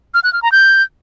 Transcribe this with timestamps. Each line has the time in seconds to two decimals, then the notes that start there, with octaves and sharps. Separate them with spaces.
0.14 F6
0.24 F#6
0.33 F6
0.42 A#5
0.52 G6